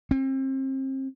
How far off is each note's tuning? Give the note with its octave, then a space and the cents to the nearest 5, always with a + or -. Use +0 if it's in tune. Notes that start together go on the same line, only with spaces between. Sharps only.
C4 +35